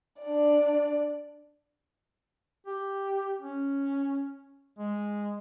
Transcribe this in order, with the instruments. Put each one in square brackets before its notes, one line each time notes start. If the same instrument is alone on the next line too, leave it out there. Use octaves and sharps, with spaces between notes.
[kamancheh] D4 D5
[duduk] G4
C#4
G#3